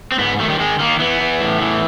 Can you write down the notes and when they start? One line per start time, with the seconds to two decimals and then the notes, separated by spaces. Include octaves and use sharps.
0.12 C4
0.18 G#2 B3
0.40 D#3 A3
0.50 G3
0.59 D#3 G#3
0.79 D#3 A#3
1.00 E3 B3
1.21 E3
1.41 A2
1.61 E3